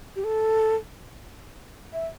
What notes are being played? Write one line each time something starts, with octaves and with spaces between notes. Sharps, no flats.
G4
A4
E5